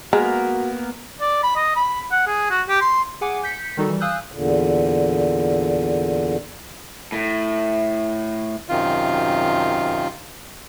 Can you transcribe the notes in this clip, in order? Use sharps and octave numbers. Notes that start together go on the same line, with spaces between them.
G#3 A#3 B3 F#4 A#4
D5
B5
D#5
B5
F#5
G#4
F#4
G4
C6
G#4 F#5 G#5 D6
G6 B6 C#7
D#3 G3 D#4 F#4 A4
E3 G3
F5 G#5 D#6 E6 F#6 G6
E2 A#2 D3
A2
F#2 C3 D#3 F4